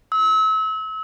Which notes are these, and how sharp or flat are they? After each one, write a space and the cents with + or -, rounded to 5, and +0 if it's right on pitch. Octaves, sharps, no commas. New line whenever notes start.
E6 -35